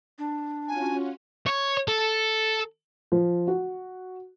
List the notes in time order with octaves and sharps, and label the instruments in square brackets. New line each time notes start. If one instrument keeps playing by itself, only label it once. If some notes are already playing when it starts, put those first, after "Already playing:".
[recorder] D4
[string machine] C#4 F4 F#4 [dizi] G#5
[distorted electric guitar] C#5
A4
[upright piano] F3
F#4